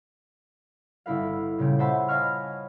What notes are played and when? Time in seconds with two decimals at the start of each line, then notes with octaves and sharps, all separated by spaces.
1.06 G1 E4 B4 F5
1.58 A#2 C#3 G3 G4
1.79 C5 C#5 E5 F#5 A5 B5
2.08 D#5 F5 G#5 B5 C#6 F6